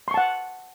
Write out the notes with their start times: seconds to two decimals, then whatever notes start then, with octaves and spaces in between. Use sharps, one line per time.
0.08 C6
0.11 C#6
0.14 A5
0.17 F#5